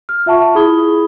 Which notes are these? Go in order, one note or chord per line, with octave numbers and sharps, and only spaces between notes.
F6
F4 E5 F#5 A5 C#6
E4 G#4 B5 D#6 G#6 G7